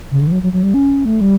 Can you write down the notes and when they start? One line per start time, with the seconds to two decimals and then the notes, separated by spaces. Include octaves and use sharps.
0.11 C#3
0.21 D3
0.27 E3
0.32 F#3
0.43 F#3
0.53 F#3
0.63 G3
0.74 C#4
1.05 A3
1.21 G3